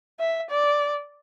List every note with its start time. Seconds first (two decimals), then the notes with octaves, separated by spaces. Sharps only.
0.20 E5
0.50 D5